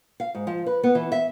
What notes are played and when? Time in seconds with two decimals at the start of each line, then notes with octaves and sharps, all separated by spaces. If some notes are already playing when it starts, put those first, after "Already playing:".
0.20 F5
0.35 G#2
0.47 F3
0.66 B4
0.84 B3
0.95 E3
1.12 E5